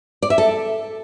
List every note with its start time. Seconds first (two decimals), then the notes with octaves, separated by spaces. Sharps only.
0.22 D5
0.30 E5
0.38 A4